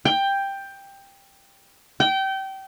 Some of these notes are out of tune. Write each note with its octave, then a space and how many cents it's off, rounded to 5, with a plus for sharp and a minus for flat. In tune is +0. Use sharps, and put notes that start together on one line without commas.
G5 +10
G5 -25